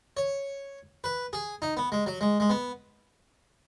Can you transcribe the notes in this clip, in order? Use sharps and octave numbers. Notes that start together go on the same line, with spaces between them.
C#5
B4
G#4
D#4
B3
G#3
F#3
G#3
G#3
B3